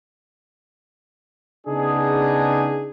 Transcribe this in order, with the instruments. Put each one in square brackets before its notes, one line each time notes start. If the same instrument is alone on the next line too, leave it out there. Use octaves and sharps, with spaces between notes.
[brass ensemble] C#3 B3 D4 D#4 G#4